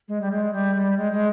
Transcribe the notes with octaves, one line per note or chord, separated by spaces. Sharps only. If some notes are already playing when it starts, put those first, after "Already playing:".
G#3
G3
G#3
G3
G3
G#3
G#3